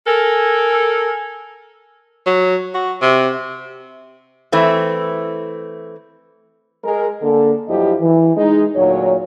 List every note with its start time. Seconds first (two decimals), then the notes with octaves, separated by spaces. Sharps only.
0.07 A4 A#4 G#5
2.26 F#3
2.75 F#4
3.02 C3
4.52 E3 A3 C4
6.84 G#3 A#4
7.22 D3 A#3 A4
7.68 G2 F3 F#3 E4 G4 D#5
8.01 E3
8.36 G#3 D#4
8.76 D2 A#2 F#3 C#5